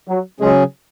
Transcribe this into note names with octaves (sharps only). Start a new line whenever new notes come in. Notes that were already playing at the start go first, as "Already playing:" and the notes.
F#3
C#3 F#3 G#3 C#4 G#4